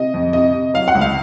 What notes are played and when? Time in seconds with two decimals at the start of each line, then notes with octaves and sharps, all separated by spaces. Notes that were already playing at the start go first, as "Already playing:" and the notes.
Already playing: C3 D#5
0.14 F2
0.33 C3 D#5
0.54 C3
0.74 F#3 F5
0.88 F#5
0.95 C#2
1.01 F5